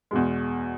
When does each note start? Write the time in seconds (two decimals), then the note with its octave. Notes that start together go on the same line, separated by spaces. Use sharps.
0.11 E2 B2 G#3